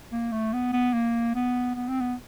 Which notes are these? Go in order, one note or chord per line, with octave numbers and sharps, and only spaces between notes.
A#3
A3
B3
B3
A#3
B3
B3
C4
B3